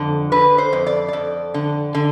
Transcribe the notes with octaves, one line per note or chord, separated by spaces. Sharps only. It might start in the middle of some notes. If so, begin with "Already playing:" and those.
Already playing: F2 D3
D3 B4
C5
F2
D5
F2 D5
D3
D3